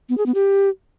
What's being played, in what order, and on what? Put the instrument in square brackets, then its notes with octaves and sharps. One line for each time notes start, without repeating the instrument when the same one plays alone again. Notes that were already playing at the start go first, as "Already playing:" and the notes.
[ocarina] B3
G#4
B3
G4